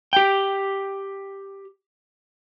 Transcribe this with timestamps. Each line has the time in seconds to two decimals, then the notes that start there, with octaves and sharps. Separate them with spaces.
0.13 G4 G5